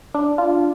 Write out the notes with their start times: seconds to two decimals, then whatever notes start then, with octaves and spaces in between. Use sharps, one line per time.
0.14 D4
0.38 F4